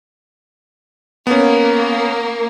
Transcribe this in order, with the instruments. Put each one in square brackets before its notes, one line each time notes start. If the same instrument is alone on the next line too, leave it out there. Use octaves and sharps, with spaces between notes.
[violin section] A#3 [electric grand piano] B3 C#4